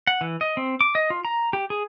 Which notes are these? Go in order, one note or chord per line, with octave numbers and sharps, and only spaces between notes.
F#5
E3
D#5
C4
D6
D#5
F4
A#5
G4
G#4